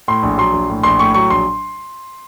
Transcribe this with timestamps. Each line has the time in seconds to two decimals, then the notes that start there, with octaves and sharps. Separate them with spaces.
0.08 A2 C6
0.23 A#1
0.38 F#3 C6
0.53 A#1
0.69 A2
0.83 A#1 C6
0.99 A2 C#6
1.14 F#3 C#6
1.30 A#1 C6